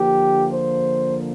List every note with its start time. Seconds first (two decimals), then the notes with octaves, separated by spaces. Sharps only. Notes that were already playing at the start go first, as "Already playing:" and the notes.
Already playing: D3 F3 A#3 G4
0.52 C5